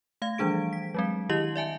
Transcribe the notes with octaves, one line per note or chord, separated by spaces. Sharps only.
A3 F5 G#6
E3 F3 G3 D4 G#4 D7
B6
F#3 G#3 C4
D#3 E4 G4 D#5 F#7
D5 E5 G#5 A5